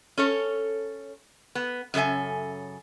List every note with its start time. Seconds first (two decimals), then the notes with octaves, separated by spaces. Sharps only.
0.18 C#4 A4 C#5
1.55 B3
1.94 F#2 C#3 A4 E5 G#5